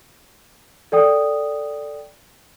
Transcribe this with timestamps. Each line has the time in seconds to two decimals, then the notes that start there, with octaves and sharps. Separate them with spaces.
0.92 A4 D5 G5 D#6